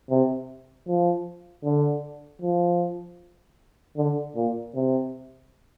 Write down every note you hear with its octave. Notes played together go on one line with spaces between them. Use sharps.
C3
F3
D3
F3
D3
A#2
C3